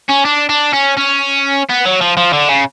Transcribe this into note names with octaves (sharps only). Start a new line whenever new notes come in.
C#4
D4
D4
C#4
C#4
B3
F#3
F3
F3
D3
C#3